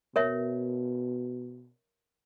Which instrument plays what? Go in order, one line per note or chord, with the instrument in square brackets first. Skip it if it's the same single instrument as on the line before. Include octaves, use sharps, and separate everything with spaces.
[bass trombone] B2 [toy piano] A#4 C#5 E5